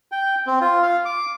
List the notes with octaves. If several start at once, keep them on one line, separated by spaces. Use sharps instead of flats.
G5
C4
F4
F5
D6